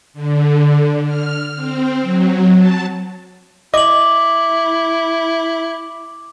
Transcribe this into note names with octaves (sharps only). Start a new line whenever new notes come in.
D3
F6
C4
F#3
A5
E4 D#5 D6 F#7